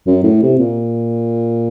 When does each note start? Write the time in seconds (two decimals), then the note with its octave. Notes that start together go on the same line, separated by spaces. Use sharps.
0.06 F#2
0.24 A2
0.42 C3
0.59 A#2